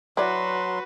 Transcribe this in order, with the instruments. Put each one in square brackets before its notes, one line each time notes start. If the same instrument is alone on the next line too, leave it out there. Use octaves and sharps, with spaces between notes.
[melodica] F#3 C6 [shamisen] E4 D5 [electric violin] F#4 B4